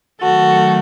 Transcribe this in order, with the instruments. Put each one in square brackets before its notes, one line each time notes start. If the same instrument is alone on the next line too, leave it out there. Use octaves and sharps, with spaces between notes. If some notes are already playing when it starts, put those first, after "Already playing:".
[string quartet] D#3 F#3 A3 F#4 A4